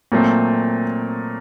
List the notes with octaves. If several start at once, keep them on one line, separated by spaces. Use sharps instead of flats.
A#2 F#3 A3 C4